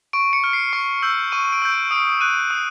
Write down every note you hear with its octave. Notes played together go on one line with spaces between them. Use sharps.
C#6 D7
C#7
F6
C7
C#6 C#7
E6 G6
C#6 D#7
D7
E6 G6
D7
D#6 D7
F#6 D#7
D#6